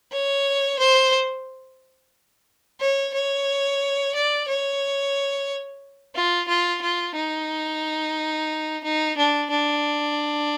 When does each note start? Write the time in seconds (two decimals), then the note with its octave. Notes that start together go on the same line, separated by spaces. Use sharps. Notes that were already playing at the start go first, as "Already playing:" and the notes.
0.12 C#5
0.79 C5
2.80 C#5
3.14 C#5
4.15 D5
4.48 C#5
6.15 F4
6.49 F4
6.82 F4
7.16 D#4
8.84 D#4
9.17 D4
9.50 D4